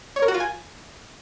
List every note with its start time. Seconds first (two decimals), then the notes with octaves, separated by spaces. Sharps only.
0.16 C#5
0.22 A#4
0.28 F#4
0.34 F4
0.40 G#5